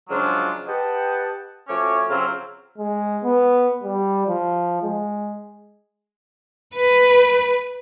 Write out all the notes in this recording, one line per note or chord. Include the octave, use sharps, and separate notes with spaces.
C#3 F3 F#3 G#3 D4 F4
G4 B4 D#5 F#5 G5 A5
F3 A3 C#4 F#4 C#5 D6
C#3 F3 F#3 C4 E5 F5
G#3
B3
G3
F3
G#3
B4